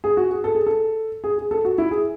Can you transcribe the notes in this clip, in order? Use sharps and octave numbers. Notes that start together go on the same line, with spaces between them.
G#4
F#4
G#4
A4
G#4
A4
G#4
G#4
A4
F#4
E4
G#4